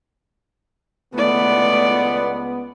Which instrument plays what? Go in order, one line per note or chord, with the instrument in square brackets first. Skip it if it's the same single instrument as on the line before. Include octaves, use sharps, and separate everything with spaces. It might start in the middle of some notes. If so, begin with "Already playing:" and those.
[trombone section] C#2 B3 [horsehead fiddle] A3 D5